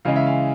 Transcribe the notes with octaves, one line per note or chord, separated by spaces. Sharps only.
C#3 E3 G#3 C#4 F5
E5
F5